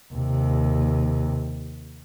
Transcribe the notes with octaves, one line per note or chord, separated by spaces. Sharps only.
D#2 C3